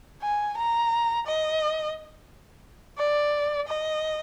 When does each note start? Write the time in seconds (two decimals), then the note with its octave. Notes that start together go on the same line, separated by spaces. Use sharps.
0.22 G#5
0.57 A#5
1.26 D#5
2.98 D5
3.67 D#5